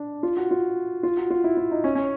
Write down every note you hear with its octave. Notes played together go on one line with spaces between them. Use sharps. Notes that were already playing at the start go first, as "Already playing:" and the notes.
Already playing: D4
F4
F#4
F4
F4
F#4
F4
E4
E4
D#4
C#4
C#4